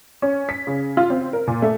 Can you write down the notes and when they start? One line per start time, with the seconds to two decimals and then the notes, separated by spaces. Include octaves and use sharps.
0.22 C#4
0.49 B6
0.67 C#3
0.97 F4
1.10 C4
1.33 A#4
1.47 A#2
1.62 A3